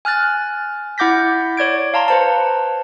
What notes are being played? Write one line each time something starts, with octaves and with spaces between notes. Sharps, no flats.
G#5 F6 F#6 A6
E4 F#5 D6 G6 A#6 B6
C#5 D5 G#6 D7
F5 A5 A#5 C6
B4 C5 A5